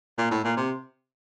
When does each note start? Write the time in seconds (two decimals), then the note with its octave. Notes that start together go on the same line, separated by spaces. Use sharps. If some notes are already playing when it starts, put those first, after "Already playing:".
0.18 A#2
0.31 A2
0.44 A#2
0.57 C3